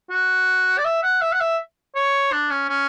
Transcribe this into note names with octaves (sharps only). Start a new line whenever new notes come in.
F#4
D5
E5
F#5
E5
F#5
E5
C#5
D4
C#4
C#4